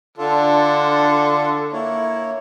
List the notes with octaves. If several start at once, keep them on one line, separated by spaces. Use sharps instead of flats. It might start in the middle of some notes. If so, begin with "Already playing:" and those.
D3 D4 F4 A4
A#3 E4 C#5